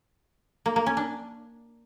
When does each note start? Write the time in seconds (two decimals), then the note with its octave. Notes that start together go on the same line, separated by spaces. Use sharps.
0.66 A#3
0.76 A#3
0.86 C#4
0.97 D4